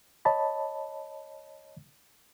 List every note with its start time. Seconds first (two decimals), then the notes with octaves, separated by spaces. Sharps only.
0.25 C#5 D#5 A5 B5